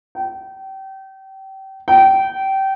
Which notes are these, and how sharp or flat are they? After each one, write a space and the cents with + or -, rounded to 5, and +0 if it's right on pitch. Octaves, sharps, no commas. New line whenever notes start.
G5 -30
G5 -25